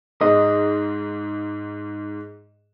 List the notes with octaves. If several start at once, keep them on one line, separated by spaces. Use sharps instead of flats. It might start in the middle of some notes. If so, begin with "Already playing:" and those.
G#2 D#5